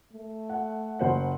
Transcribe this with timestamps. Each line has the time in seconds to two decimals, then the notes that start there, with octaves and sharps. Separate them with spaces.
0.13 A3
0.50 F#5
0.99 F#1 C5 F#5